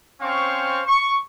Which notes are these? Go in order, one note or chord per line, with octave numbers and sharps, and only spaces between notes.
C4 C#4 C5 F5 C#6
C#6